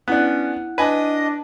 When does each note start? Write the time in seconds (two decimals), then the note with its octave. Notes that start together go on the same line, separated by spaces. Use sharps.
0.08 B3 C#4 D4 E4 F#5 F#6
0.78 D4 B4 D#5 G#5